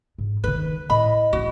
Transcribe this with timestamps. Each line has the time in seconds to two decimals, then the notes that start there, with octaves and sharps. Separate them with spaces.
0.18 G#2
0.44 D#3 D#4 B4
0.90 A2 D#5 B5
1.33 A1 G#3 F#4